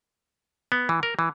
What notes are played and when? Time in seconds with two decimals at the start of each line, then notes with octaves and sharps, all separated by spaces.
0.72 B3
0.89 E3
1.03 A#4
1.19 E3